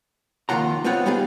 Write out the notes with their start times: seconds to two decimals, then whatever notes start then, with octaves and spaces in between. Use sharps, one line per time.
0.49 F2 D#3 A#3 F4 F#5 A#5
0.84 A3 B3 C4 F4 C#5 F#5
1.06 G3 B3 D#4 G#4 F5